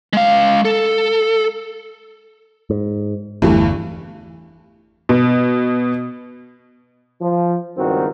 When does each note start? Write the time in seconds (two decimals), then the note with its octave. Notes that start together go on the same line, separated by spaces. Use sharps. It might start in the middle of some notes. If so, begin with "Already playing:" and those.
0.13 G#3 F5
0.65 A4
2.70 G#2
3.42 G1 E2 G2 E3 A3
5.09 B2
7.21 F3
7.77 C#2 G2 D#3 C4 F#4